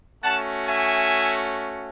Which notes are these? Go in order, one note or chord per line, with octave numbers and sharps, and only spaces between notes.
A3 C#4 F#4 F#5 A5
E5 G#5